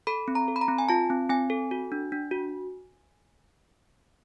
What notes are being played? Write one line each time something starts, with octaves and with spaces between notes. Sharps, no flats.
A4 B5
C4
A#5
A4
B5
A#5
C4
G#5
F4 A5
C4
C4 G#5
A4
F#4
D4
D4
F#4